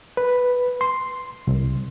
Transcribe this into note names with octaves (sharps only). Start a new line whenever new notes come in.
B4
C6
C2